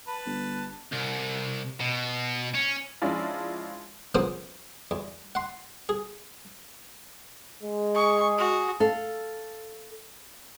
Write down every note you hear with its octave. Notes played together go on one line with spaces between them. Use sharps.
B4 A5
G1
C2
B2
C#4
F3 G#3 C#4 D4 E4 F4
C#3 F3 A#3 B3 C5 D#6
E2
F#5 C6
G#4
G#3
G#4 C#6
F#4
A4 F5